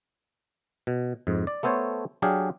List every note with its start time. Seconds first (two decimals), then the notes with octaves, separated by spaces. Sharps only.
0.87 B2
1.27 F2 G#2
1.47 D5
1.63 A3 B3 A4 C5 C#5
2.22 F#3 D4 G4 G#4 F5